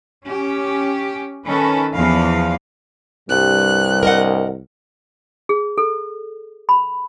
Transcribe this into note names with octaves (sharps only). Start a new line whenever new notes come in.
C#4 G4
D#3 C#4 A4 B4
E2 E3 F3 F5
C2 G2 G3 F#6
A#4 D#5 F#5
G#4
A4
B5